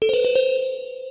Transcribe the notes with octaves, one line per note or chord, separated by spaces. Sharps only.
A4
C5
B4
B4
C5